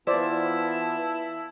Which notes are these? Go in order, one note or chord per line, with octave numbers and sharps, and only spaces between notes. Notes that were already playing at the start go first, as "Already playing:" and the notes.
E3 B3 E4 F4 C5 D5 A5